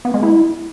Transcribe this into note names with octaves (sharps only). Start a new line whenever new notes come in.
B3
G#3
E4